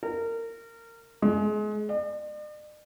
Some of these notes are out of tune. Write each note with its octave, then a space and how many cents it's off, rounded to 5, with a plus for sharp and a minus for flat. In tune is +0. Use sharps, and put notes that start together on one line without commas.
A#4 -25
G#3 +30
D5 +45